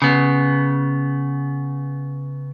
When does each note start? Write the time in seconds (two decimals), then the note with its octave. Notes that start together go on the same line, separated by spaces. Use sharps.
0.02 C#3 B3